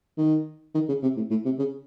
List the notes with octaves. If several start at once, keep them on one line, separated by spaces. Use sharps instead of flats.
D#3
D#3
C#3
C3
A2
A2
C3
C#3